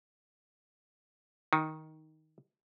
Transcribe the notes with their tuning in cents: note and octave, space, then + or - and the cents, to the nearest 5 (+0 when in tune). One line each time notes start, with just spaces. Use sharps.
D#3 +10 D#4 +0